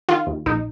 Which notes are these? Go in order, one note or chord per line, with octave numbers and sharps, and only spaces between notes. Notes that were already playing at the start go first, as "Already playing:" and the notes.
D#3 F4
D#2
A#1 D#4